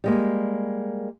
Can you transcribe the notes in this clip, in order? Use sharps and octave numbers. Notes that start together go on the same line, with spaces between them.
G3 G#3 A#3